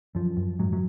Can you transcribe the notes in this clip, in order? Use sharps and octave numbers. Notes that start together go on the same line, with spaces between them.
F#2 F3
F#2
G#2 F#3
F#3